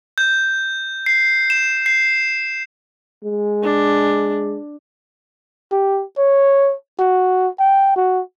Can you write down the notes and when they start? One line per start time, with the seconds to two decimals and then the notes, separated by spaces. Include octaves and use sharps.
0.18 G6
1.06 C7
1.50 E7
1.86 C7
3.24 G#3
3.63 D4
5.72 G4
6.18 C#5
6.99 F#4
7.59 G5
7.96 F#4